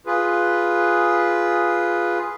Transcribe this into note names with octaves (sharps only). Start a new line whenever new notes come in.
F4 G#4 B4